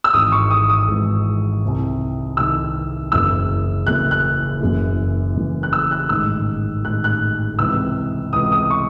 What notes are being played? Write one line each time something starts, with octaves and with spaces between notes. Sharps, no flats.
E6
G#1 G#2 E3 D#6
C#6
D#6
D#6
G#1 G#2 E3
C2 C3 D#3
C2 C3 D#3 E6
F#1 F#2 C#3 E3 E6
F#1 F#2 C#3 E3 F#6
F#6
F#1 F#2 E3
F#1 F#2 E3
F#6
E6
F#6
A1 G#2 D#3 E6
A1 G#2 D#3 F#6
F#6
C#2 C3 E3 E6
C#2 C3 E3 D#6
D#6
C#6